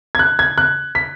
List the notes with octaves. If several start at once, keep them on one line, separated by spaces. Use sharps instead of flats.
G#6
F#6
G#6
F#6
B6